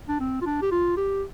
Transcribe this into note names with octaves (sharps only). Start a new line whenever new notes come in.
D4
C4
F4
D4
G4
F4
G4